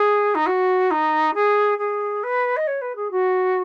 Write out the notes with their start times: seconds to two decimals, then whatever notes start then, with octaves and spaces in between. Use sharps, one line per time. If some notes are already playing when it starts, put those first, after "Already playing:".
Already playing: G#4
0.35 D#4
0.46 F#4
0.90 D#4
1.34 G#4
1.78 G#4
2.23 B4
2.56 D#5
2.67 C#5
2.81 B4
2.96 G#4
3.11 F#4